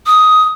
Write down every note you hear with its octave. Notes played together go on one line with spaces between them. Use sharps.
D#6